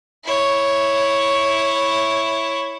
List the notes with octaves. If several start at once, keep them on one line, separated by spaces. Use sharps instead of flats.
E4 C#5